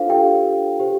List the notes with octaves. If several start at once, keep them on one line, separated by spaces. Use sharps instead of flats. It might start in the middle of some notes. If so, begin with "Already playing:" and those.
Already playing: D4 F4 A4 C5 F5
G4 G5
G4 C5